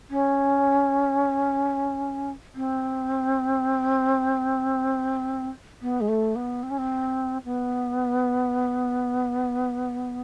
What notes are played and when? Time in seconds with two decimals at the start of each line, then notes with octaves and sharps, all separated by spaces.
0.10 C#4
2.55 C4
5.82 B3
6.00 G#3
6.08 A3
6.35 B3
6.63 C4
6.70 C#4
6.78 C4
7.44 B3